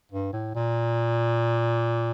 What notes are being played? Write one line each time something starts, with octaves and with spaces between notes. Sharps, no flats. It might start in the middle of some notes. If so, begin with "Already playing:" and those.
G2
A2
A#2